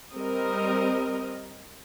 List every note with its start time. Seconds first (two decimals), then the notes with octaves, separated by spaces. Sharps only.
0.13 G3 C4 A#4 D#5